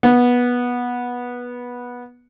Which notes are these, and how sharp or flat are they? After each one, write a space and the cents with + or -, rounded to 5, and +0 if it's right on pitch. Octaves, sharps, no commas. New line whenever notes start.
B3 -15